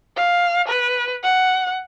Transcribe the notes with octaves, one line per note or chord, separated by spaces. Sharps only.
F5
B4
F#5